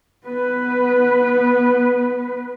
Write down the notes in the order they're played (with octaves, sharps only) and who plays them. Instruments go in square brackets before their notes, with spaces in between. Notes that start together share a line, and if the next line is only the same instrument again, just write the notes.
[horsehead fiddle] B3 B4